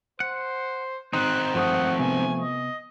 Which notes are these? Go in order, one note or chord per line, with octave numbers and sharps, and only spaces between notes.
C5 F#5
D#3 C4 D#4 C6 F#6
G2 F3 A3 C5 F#5 D#6
C3 B3 G#5
D#5